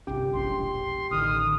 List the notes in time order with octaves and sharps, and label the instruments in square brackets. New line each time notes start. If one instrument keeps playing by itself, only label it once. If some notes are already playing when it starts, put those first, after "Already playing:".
[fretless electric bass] G1 C2 C#4 [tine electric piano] G4 G5
[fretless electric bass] E1 A#1 [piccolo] C6
[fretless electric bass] A1 D3 D#3 [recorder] D#6 [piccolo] F6